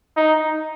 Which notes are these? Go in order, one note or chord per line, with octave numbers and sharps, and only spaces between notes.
D#4